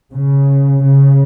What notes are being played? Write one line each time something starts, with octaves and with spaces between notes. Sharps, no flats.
C#3
C#3